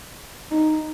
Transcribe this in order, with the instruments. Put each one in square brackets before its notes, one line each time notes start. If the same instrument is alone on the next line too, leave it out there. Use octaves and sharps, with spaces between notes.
[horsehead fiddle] D#4